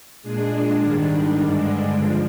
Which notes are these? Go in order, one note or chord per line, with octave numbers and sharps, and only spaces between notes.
A#2 G#3 D4 G#4
G#2 D#3 G3 D4
G2 D3 G#3 D4
F3